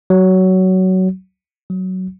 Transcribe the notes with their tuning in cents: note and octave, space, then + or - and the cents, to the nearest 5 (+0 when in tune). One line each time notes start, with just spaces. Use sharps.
F#3 +15
F#3 +10